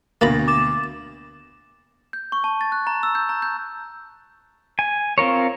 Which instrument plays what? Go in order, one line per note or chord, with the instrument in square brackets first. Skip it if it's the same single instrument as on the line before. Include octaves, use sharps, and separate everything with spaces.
[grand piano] D2 B2 [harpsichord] A#3 A#5 B5 [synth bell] A6 A#6
[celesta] D6 [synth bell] A6 E7
[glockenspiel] G6
C#6
A5
A6
F#6
A#5
E6
G6
A#5
G6
[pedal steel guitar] G#5
C4 F4 A#4 C#5